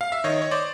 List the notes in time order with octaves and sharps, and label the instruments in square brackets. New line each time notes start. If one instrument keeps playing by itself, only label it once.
[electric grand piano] F5
E5
D#3 C#5 D#5
C#5
C5 D5